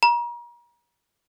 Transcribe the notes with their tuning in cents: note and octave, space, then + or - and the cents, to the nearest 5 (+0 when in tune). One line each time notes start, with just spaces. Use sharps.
A#5 +40